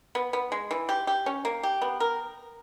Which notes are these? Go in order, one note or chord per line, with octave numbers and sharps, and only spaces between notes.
B3
B3
G#3
E3
G4
G4
C#4
A#3
G4
B3
A#4